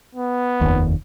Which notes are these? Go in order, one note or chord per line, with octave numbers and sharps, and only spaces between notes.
B3
F1 D#2